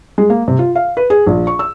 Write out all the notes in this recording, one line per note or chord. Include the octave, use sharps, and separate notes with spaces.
G#3
A#3
C3
F4
F5
B4
G#4
A#1
C#6
E6